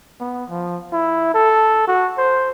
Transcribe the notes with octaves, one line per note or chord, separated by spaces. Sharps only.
B3
F3
E4
A4
F#4
C5